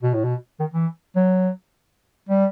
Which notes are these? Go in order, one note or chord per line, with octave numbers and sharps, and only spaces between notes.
B2
A2
B2
D#3
E3
F#3
G3